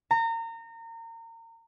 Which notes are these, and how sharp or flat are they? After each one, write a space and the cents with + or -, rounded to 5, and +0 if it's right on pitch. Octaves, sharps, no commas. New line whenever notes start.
A#5 -30